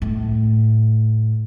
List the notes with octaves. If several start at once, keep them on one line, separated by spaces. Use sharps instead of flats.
A2